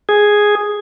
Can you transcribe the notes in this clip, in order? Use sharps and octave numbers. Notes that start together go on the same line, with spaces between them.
G#4